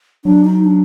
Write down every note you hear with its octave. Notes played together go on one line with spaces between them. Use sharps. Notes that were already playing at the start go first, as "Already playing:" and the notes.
F#3 D4
D#4
D4